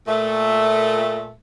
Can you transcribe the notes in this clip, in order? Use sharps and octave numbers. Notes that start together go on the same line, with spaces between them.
A#2 A3